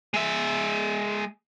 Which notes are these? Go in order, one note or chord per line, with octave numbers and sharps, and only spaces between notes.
G#3 E5